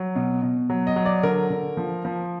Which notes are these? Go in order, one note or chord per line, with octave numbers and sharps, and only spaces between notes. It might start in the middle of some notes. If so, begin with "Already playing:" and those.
Already playing: F#3
B2
B2
F#3
D#5
F#3
D5
D3 A#4
D3
F3
F3